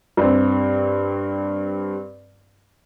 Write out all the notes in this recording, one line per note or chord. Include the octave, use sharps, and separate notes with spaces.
G2 C4